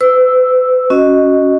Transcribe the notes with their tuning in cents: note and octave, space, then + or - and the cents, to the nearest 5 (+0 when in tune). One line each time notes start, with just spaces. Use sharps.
B4 +45 E6 +0
C#4 +0 F#4 +0 D#5 +0